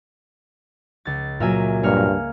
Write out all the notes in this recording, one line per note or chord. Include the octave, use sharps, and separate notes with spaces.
C#2 A6
A#2 F#3 A#4 E5 G#5
G2 A#3 C#5 F6